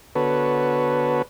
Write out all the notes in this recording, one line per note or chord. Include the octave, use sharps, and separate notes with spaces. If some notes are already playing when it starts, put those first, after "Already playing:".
D3 B3 F#4 A4 B4 C#5